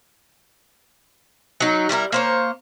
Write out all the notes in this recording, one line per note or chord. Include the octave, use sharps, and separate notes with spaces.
F#3 D#4
G3 E4 F4 A#4
A#3 C5 C#5